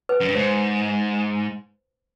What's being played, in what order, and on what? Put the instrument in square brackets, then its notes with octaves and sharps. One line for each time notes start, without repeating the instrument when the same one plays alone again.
[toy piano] B4
[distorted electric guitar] F#2
G2
[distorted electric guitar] G#2 [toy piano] C5